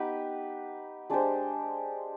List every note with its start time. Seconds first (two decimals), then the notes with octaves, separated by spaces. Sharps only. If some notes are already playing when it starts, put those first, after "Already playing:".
Already playing: B3 D#4 G4 B4
1.10 G#3 D4 G4 C5